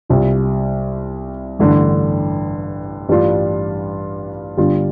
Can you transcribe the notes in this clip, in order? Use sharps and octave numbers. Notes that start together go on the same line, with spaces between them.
C2 C3 G3 F4
A1 G2 D3
A1 G2 G3 D4 F4
G1 G2 G3 D4 F4